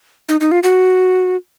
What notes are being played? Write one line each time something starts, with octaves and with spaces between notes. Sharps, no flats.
D#4
D#4
F4
F#4